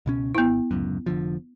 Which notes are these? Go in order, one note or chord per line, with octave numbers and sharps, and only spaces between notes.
C#2 B2 C#4
G#1 B3 E4
D1 C#2 F#2
F1 D3 F3